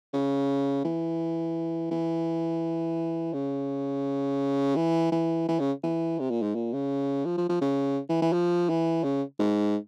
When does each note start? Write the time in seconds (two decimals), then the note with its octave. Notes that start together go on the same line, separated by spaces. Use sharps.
0.14 C#3
0.85 E3
1.91 E3
3.34 C#3
4.76 E3
5.12 E3
5.48 E3
5.60 C#3
5.83 E3
6.19 C3
6.30 A#2
6.42 G#2
6.55 A#2
6.73 C#3
7.25 F3
7.38 F3
7.49 F3
7.61 C#3
8.09 E3
8.22 E3
8.33 F3
8.69 E3
9.04 C#3
9.39 G#2